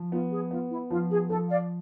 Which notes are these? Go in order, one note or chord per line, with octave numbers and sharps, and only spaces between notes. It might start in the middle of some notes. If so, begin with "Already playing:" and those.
Already playing: F3
B3 F4
G#4
B3 F4
E4
F3 F4
G#4
F3 A4
D5 F5